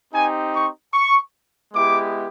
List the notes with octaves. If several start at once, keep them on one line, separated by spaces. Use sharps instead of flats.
C4 D#4 G4 G#5
C#6
C#6
G#3 B3 E4 G4 D6